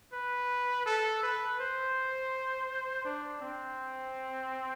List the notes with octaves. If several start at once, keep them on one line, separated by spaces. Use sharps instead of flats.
B4
A4
B4
C5
D4
C4